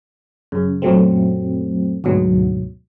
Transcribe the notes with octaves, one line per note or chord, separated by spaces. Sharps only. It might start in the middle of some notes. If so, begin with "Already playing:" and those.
F#2 C#3
F#2 A#2 F#3 A3 C4
D2 G#2 B2 F#3